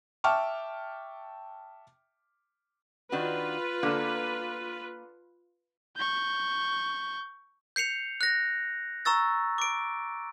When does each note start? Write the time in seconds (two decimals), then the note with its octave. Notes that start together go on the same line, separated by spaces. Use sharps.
0.24 E5 G5 A5 C#6 D6 F6
3.12 D#3 D4 F4 F#4 B4
3.83 D3 A#3 A5
5.96 C#6 G6
7.76 G6 C7 C#7 F7
8.21 F#6 A#6
9.05 A#5 C#6 E6 A6
9.58 D6 D7